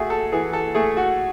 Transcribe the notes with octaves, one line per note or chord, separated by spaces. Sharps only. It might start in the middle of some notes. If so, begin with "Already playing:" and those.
Already playing: A3 E4 F#4 G#4
A4
E3 G#4
A4
A3 G#4
F#4